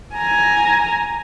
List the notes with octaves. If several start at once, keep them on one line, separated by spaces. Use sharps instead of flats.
G#5 A#5